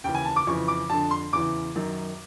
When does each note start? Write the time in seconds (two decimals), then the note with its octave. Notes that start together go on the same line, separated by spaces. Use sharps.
0.04 D#2 C#3 E3 G5
0.15 G#5
0.25 A5
0.36 D6
0.47 F2 C#3 E3 C#6
0.68 D6
0.89 F2 D3 A5
1.11 C6
1.33 E2 C#3 E3 D6
1.76 F#2 D#3